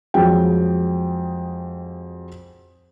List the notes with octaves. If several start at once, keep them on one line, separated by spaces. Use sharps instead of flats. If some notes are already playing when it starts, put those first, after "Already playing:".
F2 F#3 G#3 G5